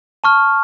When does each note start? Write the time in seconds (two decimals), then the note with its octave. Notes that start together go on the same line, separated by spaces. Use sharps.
0.24 A5 C#6 F6